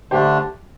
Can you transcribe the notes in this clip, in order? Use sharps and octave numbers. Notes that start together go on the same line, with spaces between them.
D3 A3 D4 G4 C5